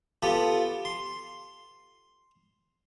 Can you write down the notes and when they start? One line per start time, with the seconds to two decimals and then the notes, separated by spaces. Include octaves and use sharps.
0.23 B3 F4 G4 A4
0.85 C6